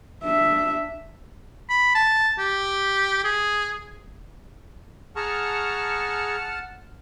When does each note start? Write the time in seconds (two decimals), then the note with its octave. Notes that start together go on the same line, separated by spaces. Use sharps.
0.24 D4 E5
1.70 B5
1.95 A5
2.39 G4
3.24 G#4
5.16 G#4 F#5 A5 A#5 C#6 F6